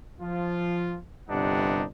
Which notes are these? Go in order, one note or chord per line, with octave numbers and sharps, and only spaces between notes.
F3 F4
G1 G2 C3 D4 D#4 F#5